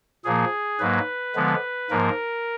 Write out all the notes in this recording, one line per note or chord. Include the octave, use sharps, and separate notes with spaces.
A#2 F3 A#3 G#4
G#2 F#3 A#3 B4
D3 F3 G#3 B3
G#2 F3 A#3 A#4